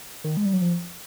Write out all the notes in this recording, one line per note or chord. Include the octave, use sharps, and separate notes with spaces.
D#3
G#3
G3
F#3
F3